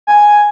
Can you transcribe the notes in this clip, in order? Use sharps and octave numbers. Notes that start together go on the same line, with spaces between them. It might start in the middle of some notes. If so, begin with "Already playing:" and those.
G#5